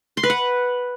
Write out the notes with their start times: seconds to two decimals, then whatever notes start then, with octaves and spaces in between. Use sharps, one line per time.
0.17 C6
0.23 B4
0.30 F#5